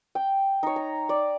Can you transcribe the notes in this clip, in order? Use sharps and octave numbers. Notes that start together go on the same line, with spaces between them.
G5
D#4 C#5
A#5
D5